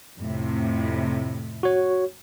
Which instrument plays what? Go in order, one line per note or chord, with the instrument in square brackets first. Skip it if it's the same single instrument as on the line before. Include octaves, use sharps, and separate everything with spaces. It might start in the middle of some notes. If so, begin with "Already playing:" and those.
[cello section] F2 A2 C3
[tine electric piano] F#4 C#5